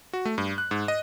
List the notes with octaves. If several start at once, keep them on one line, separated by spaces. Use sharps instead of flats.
F#4
A3
G2
F#6
G#2
D#5